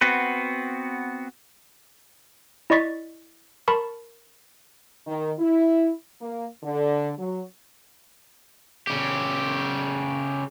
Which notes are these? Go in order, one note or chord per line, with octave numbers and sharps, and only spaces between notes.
B3 C4 F#4 B4
E4 D5 D#5 C#6 A6 B6
A#4 A5 B5 C#6 F6
D#3
E4
A#3
D3
F#3
C#3 G4